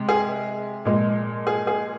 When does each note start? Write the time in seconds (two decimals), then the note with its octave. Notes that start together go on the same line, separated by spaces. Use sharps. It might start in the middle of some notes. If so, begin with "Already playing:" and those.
Already playing: C3 G#3
0.09 G#4
0.85 A#2 F3 G#3
1.47 G#4
1.67 G#4